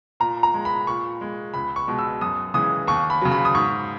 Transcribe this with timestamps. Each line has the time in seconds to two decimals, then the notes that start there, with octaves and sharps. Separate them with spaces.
0.20 A#2 A#5
0.43 A#5
0.54 G#3
0.65 B5
0.87 A#2 C#6
1.21 G#3
1.54 C#2 B5
1.76 C#6
1.87 B2 G#3
1.99 E6
2.21 F#2 D#6
2.54 C#3 E3 G#3 D#6
2.87 D#2 C#6
3.10 B5
3.22 C#3 F#3
3.32 B5
3.45 D#6
3.55 G#2 C#6